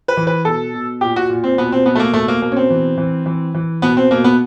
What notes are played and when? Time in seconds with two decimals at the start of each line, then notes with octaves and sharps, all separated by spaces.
0.08 B4
0.17 E3
0.27 B4
0.45 B2 A4
0.74 B2
1.01 A#2 G4
1.16 F#4
1.30 A#2
1.44 C4
1.58 B2 B3
1.72 C4
1.86 B2 B3
1.95 A3
1.99 A#3
2.13 B2 A3
2.28 A#3
2.42 B2 A#3
2.52 C#4
2.56 C4
2.70 E3
2.98 E3
3.26 E3
3.54 E3
3.82 B2 B3
3.97 C4
4.11 B2 A#3
4.24 B3